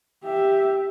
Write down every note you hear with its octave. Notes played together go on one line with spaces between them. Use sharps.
G4 E5